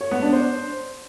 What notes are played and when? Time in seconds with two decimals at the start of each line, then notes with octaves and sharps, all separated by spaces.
0.01 C#5
0.11 B3
0.22 D4
0.33 C5